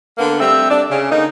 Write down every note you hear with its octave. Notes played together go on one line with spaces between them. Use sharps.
D3 A#3 B3
G3 A3 C4 E5
D4
C#3
D3 A#3 D#4